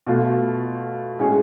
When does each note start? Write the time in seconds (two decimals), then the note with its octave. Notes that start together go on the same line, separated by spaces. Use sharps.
0.07 B2 A3 F4
1.19 A2 G#3 C#4 G#4 C#5